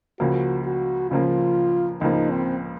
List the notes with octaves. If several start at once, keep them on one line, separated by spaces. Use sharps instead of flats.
C#2 C#3 F3 A#3 F#4
F#4
C#2 C#3 F3 A#3 F4
C#2 C#3 F3 A#3 D#4
C4